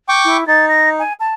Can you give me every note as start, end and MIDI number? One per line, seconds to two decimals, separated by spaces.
0.09 0.37 79
0.09 0.37 85
0.09 0.37 86
0.25 0.46 64
0.47 1.02 63
0.47 0.65 93
0.69 0.89 94
0.99 1.13 80
1.20 1.34 81